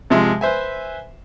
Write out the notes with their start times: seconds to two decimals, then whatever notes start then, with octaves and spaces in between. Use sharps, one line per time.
0.10 C3 F3 G#3 E5 C6
0.41 B4 C5 E5 G#5